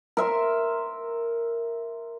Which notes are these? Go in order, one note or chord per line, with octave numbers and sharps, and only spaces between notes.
A#4 E5 C6